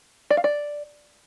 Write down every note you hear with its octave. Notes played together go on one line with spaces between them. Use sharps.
D5
F5
D5